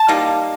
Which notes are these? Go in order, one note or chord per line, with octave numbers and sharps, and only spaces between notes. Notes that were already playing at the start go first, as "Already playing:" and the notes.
Already playing: A5
G3 A#3 D#4